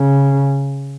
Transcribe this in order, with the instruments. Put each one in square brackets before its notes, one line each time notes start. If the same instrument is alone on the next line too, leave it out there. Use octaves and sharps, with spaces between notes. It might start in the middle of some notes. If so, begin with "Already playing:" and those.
Already playing: [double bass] C#3